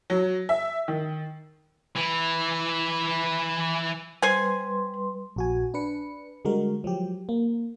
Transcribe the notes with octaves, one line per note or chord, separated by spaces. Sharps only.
F#3
E5
D#3
E3 E4
G3 B4 C5 G#5 C6
A#1 F#4 G#5
D4 B4 C#7
D3 G3 G#3 F#4 A#4
F3 F#3 G4
A#3